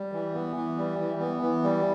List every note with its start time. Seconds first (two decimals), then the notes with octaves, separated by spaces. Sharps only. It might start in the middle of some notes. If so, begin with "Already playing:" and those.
Already playing: G3
0.12 E3
0.34 B3
0.56 E3
0.78 G3
0.99 E3
1.20 B3
1.42 E3
1.64 G3